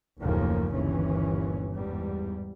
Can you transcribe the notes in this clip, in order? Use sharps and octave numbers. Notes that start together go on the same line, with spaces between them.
F#1 D#2 A2 C#3 F3 A#3
G1 D#2 A#2 E3 C#4
E2 G#2 G3